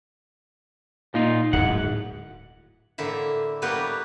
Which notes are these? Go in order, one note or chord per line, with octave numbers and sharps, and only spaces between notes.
A#2 D#4 F4
D1 G#2 F#5
A2 D3 A#3 E4 E5
G3 A#3 B3 G4 B4 C#5